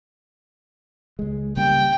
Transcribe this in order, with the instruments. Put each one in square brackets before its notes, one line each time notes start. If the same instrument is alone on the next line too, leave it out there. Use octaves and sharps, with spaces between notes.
[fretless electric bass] C#2 G#3
[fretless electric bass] C#3 G3 A#3 [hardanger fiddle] G5